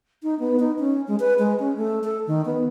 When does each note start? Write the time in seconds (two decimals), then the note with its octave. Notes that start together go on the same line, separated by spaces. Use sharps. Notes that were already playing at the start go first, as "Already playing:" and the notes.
0.23 D#4
0.39 B3
0.59 D#4
0.79 C#4
1.08 G#3
1.20 B4
1.39 G#3
1.59 C#4
1.77 A3
2.04 A4
2.27 D#3
2.45 B3